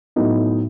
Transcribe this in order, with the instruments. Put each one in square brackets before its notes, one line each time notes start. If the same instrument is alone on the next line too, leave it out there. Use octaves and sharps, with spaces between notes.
[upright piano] A2 F#3 B3 D#4